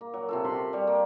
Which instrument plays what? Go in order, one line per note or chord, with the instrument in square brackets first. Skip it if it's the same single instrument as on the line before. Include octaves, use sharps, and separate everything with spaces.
[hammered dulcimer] A#3
F#3
C3 F4 A4
F#4 G4 B5 C6
G3 C#5
A#3